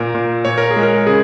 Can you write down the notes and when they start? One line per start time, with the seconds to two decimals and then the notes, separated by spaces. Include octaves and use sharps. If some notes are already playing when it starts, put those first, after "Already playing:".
Already playing: A#2 A#4
0.15 A#2
0.45 A#2 C#5
0.58 A#4
0.71 G#4
0.76 G#3
0.83 A#4
1.06 C#3 G#4